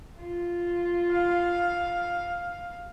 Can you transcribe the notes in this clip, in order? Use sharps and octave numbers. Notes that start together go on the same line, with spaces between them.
F4
F5